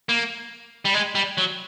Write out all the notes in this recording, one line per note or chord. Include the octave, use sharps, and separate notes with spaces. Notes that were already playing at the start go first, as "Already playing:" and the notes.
A#3
G3
G#3
G3
F#3